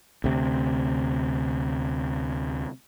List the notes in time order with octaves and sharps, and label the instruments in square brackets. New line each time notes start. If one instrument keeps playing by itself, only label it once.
[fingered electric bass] D2 C3